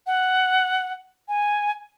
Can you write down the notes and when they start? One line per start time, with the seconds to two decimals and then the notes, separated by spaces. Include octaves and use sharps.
0.07 F#5
1.28 G#5